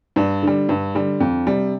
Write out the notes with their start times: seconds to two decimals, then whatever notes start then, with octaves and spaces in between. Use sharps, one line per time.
0.16 G2 D4
0.43 D3 G3
0.69 G2
0.95 D3 G3
1.20 F2
1.46 C3 G3